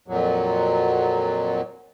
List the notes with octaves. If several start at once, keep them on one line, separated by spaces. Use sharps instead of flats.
F2 A#2 F#3